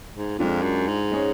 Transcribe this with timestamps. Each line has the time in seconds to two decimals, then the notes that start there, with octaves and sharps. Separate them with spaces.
0.14 G#2
0.39 F2 G#3 D4 F4
0.62 F#2
0.88 G#2
1.12 G#3 C#4 G#4 C#5